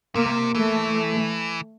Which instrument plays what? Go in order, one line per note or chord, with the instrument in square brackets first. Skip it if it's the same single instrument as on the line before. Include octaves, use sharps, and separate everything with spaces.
[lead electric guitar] C3 [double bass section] A#3
[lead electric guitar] E3 [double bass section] A3